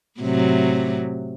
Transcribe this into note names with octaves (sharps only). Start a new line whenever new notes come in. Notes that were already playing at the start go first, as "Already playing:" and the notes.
A2 C3 F#3